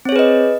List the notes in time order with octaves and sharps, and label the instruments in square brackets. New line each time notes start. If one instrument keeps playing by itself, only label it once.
[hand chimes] C4
C#5
G#4
B4
D#5